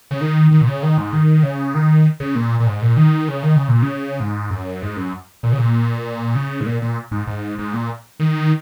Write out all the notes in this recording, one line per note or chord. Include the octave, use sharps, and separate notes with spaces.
C#3
D#3
D#3
A#2
C#3
D#3
G#2
D#3
C#3
D#3
C#3
A#2
A#2
G#2
A#2
D#3
C#3
D#3
C#3
A#2
C#3
G#2
F#2
G#2
F#2
A#2
C#3
A#2
C#3
G#2
A#2
A#2
G#2
G#2
G#2
A#2
D#3